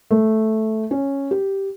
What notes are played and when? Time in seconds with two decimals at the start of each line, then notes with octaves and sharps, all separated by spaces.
0.11 A3
0.91 C#4
1.31 G4